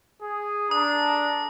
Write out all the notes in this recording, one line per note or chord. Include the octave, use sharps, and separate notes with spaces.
G#4
D4 A4 A#5 D#6